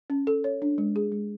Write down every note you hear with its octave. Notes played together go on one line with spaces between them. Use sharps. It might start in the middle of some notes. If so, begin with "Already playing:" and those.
C#4
A4
C#5
D4
G#3
G#4
G#3